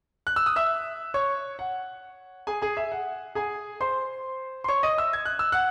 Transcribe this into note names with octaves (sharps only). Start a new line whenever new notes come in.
F#6
E6
D#6
E5 E6
C#5 C#6
F#5
G#4 G#5
G#4 G#5
E5
F#5
G#4 G#5
C5 C6
C6
C#5 C#6
D#5 D#6
E5 E6
G#6
F#6
E6
F#5 F#6